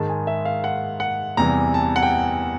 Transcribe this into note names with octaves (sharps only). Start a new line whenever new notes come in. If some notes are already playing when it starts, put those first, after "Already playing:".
Already playing: G#2 D#3 G#3 A5
G#5
E5
F5
F#5
F#5
E2 C3 E3 G3 A#5
A5
F#5
G5